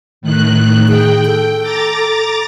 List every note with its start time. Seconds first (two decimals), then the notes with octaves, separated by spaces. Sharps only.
0.21 A2 D#3 F#6
0.89 G#4 G5
1.25 A4
1.63 A#5 D6 A6